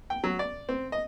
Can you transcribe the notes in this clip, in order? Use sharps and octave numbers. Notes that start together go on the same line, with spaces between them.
G5
F#3
D5
C4
D#5